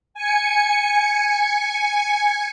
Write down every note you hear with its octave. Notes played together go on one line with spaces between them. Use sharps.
G#5 C#7